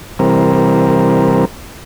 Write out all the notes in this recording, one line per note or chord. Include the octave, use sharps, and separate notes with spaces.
C3 E3 G3 C4 A#4